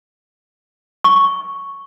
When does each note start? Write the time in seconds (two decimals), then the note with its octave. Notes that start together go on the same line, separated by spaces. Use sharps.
1.04 C#6